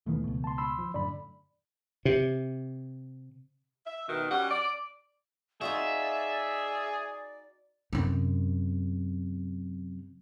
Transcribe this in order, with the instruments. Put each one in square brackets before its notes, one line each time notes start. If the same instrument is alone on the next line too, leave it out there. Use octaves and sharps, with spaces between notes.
[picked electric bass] D#2 B2 D#3 [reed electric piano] E3 A3
[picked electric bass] C#2 B2
[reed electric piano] A5 C6
B5 C6 E6
[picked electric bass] F3
[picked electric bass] F#2 A2 D3 [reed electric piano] D5 B5
[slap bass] C3
[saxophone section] E5
B2 D#3
G3 C#4 F#5
D5
[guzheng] D#4 F4 F#4 [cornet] G#4 [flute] D5 [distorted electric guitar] E5
[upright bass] F#2 C3